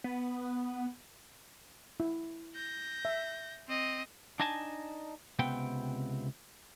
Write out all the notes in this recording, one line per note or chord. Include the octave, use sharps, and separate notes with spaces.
B3
E4
G6 A#6
E5
C4 D#5
D4 D#4 D#5 G#5 A5
C#2 C3 B3 C4 G5